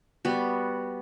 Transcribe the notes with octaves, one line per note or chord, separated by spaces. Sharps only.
G3 B3 F#4